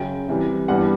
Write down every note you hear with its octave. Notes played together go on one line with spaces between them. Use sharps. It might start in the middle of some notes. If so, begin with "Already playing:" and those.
Already playing: F#2 C#3 F#3 G5
C3 E3 G3
G2 E3 G3 B3 F#5